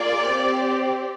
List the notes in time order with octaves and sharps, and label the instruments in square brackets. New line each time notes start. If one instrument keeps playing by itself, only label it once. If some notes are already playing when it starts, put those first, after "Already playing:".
Already playing: [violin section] A#3 F4 G#4 D5
C4 G4